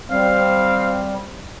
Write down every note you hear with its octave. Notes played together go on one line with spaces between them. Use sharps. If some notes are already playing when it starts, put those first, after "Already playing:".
G3 C4 F5